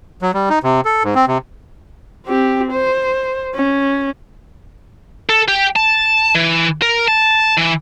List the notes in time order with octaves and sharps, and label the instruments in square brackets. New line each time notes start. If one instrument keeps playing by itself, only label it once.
[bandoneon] F#3
G3
D#4
C3
A4
G#2
C4
C3
[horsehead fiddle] C4 G4
C5
C#4
[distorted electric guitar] A4
G4
A5
E3
A#4
A5
E3